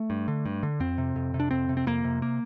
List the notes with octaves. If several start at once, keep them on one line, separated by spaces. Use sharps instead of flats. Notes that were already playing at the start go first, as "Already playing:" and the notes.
Already playing: A3
G2
D3
G2
D3
F2 C4
C3
F2
C3
D4
F2 C4
C3
C4
F2 A#3
C3
A#3